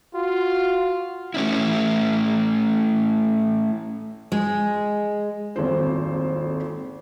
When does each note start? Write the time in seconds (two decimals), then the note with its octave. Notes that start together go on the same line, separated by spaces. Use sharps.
0.15 F4 F#4
1.34 A3 C#4 E4
4.32 G#3
5.56 D#1 G#1 F2 E4 C5